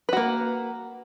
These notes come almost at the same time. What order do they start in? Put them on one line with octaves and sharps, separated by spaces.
B4 F#4 A#3